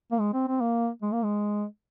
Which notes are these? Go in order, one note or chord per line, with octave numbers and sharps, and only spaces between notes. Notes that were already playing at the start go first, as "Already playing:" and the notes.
A#3
G#3
C4
C4
A#3
G#3
A#3
G#3